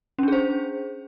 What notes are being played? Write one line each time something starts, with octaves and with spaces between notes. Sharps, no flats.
C#4 D4 G#4 C5